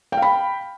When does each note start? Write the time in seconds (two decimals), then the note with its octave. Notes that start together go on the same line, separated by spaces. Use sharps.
0.12 G5
0.17 F5
0.22 B5